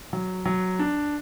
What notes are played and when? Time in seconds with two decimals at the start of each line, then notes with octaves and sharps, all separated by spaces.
0.13 F#3
0.46 F#3
0.79 D4